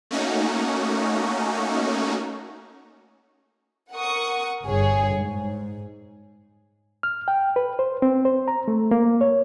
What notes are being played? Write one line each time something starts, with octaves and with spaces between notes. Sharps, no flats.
A3 A#3 C#4 D#4 F#4
A#4 F#5 C#6 D#6
G1 G#4 C#5
G#2
F6
G5
B4
C5
C4
C5
A#5
A3
A#3
C#5